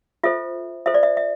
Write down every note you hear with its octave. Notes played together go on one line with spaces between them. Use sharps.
F4 A4 C5 E5
F4 A4 C5 E5
D5
E5
E5